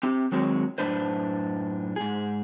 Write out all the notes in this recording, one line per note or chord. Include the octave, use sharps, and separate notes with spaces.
C4 G4
D#3 F#3 G#3 C4 B4 C#5
F#2 A2 F#3 D4 B4 C5
G#2 G#4